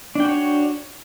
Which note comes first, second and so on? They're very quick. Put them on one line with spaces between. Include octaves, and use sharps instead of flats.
D4 G5 F#4 C#5